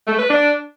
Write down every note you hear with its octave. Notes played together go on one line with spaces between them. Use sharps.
A3
B4
D4